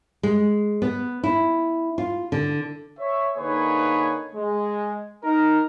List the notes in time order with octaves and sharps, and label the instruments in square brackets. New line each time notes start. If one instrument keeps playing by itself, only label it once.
[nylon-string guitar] G#3
B3
E4
F4
D3
[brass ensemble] C#5 E5
D3 A#3 D#4 G#4 B4 C#5
G#3
D#4 A#4